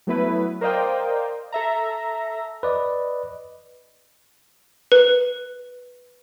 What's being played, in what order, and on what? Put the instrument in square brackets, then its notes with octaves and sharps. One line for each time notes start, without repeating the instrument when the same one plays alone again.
[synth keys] F#3 A3 B3 E4 B4
A#4 C5 D5 D#5 F5 G5
A4 E5 A#5
[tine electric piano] B4 D5 D#5
[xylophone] B4